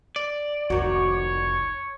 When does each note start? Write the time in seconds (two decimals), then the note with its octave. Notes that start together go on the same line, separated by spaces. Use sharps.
0.16 D5
0.70 F1 C#2 D#3 F#4 C#5